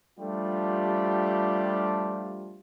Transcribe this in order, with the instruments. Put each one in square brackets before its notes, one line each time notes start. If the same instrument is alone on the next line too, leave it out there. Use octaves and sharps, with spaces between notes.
[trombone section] F3 G3 A3 D4 F4 G4